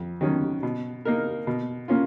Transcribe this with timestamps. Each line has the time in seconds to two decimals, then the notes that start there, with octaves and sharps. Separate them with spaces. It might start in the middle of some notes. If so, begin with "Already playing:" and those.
Already playing: F2
0.21 D#3 F#3 C#4
0.63 B2
1.05 A#3 D#4 A#4
1.47 B2
1.88 A#3 C#4 F4